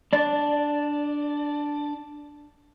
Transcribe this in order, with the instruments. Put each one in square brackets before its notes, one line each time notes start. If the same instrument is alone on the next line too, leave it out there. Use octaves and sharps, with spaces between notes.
[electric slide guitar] D4 D5